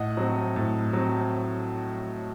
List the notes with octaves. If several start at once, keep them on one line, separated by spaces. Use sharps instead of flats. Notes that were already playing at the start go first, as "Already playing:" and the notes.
Already playing: A2 D#5 F#5
F#3 C4
A2
F#3 C4